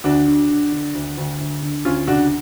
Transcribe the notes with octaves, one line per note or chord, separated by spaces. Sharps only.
D2 D4 F#4
D3
D3
D3
D2
D2
D2
D3
D2 C#4 F4
C#3 D4 F#4